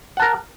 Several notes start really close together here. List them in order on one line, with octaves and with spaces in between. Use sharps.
F#5 A5 A#4